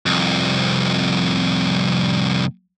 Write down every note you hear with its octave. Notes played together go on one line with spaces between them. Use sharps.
C2 F2